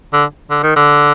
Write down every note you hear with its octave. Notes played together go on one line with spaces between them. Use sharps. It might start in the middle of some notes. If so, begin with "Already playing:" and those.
D3
D3
D#3
D3